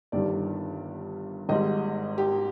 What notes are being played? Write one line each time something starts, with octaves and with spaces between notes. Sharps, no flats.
G1 G2 D#3 G3 D5
G#1 G#2 G3 D#5
G4